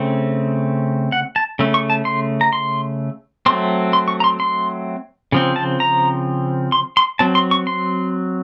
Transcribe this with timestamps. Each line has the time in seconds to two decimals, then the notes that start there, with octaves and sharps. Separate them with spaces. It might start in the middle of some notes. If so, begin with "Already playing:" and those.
Already playing: C#3 A3 C4
1.12 F#5
1.36 A5
1.59 C#3 A3
1.74 C#6
1.90 A5
2.05 C6
2.41 A#5
2.53 C6
3.46 F#3 A3 C4 C6
3.93 C6
4.08 C#6
4.20 A#5
4.24 C6
4.40 C6
5.32 C#3 F3 C4
5.56 A5
5.80 A#5
6.72 C6
6.97 C6
7.19 F#3 C4 A5
7.35 C6
7.51 C#6
7.67 C6